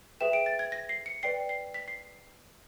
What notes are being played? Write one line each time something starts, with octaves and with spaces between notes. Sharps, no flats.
G#4 B4 E5 G5 E7
D7
A6
G#6
A#6
C7
C#7
B4 D5 G5 C7
C7
B6
C7